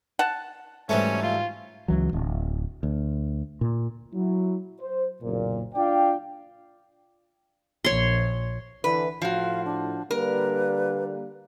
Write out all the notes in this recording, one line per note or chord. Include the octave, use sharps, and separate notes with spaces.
F#5 A5
G#2 E3 F#3 G3 A3 C#4
F4
C#2 E3 F#3
D1
D2
A#2
F#3 E4
C5
F#1 B1 A#2
D4 F4 D5 F5 G5
A#1 C#5 C6
D3 E3 B4
A2 F3 F#4 F5
D4
D3 G3 A#3 A#4 B4